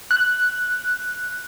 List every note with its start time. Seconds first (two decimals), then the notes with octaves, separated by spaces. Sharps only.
0.11 F#6